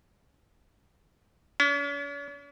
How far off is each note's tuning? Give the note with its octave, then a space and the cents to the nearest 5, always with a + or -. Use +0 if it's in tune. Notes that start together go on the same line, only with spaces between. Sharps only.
C#4 +45